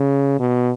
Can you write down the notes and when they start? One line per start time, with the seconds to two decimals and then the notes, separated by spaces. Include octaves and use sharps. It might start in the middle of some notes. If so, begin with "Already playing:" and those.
Already playing: C#3
0.39 B2